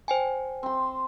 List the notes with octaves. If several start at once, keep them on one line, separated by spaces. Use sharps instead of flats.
C5 G5 G#5
C4 C6